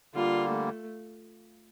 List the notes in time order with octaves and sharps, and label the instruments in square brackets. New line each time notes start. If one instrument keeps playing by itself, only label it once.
[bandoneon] D3 G3 A#3 [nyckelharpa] F4
[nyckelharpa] A3